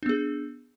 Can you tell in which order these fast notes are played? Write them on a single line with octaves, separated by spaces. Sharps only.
D4 B3 G#4